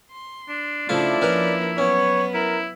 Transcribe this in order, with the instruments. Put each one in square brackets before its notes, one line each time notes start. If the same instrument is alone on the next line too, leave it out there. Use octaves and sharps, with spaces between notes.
[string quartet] C6
[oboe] D4
[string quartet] C#3 D4 [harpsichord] F3 A3 F4 [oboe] E4 [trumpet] D5
[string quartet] F3 A#3 D4 [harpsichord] C#4 A#4 B4
[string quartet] F#3 B3 B4 [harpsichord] C#4 [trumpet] C#5
[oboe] E4 [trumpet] A#4